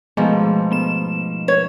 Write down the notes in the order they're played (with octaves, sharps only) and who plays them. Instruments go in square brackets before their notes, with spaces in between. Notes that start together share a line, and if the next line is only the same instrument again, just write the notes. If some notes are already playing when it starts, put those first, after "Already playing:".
[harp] G#2 B2 F3 [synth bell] G#3 A3
[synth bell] A3 B3 E7
[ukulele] C#5